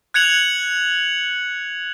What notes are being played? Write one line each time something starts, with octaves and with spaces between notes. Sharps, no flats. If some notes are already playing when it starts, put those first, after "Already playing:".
F#6 G#6 C#7 F7 F#7